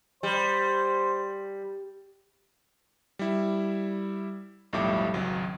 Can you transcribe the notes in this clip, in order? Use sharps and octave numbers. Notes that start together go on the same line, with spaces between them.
G3 C5
G3 E4
B1 F2 A2 G3 E5 D6
G#1 C#2 F#3